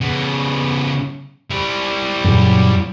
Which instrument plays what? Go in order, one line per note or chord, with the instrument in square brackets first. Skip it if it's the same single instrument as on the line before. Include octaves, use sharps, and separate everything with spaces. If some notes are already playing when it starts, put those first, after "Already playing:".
[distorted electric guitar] C#3 B3
G3 E4
[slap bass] F#2 A#2 C#3